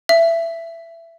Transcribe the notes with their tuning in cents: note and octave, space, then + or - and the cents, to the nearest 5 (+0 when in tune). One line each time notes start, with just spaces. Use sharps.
E5 +20